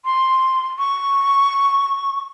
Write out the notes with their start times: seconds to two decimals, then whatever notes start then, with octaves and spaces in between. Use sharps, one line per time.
0.05 C6
0.79 C#6